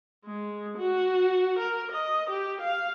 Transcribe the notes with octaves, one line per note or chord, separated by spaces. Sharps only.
G#3
F#4
A#4
D#5
G4
F5